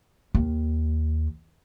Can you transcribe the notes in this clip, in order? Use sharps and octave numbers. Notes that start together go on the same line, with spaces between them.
D#2